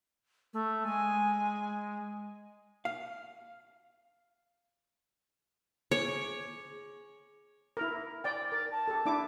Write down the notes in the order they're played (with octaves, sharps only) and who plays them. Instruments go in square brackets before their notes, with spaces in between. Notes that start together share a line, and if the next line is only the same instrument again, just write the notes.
[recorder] A3
[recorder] G#3 [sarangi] G#5
[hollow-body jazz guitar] F5
[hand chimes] G#4 [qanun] C#5
[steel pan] E4 A#4
[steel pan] D5 G5 [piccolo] A6
[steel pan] A#4 [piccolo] A6
[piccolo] A5
[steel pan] G4 A4
D4 E4 D6